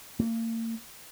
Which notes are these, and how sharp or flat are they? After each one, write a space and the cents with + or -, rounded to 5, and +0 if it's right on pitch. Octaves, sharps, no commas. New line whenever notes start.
A#3 -40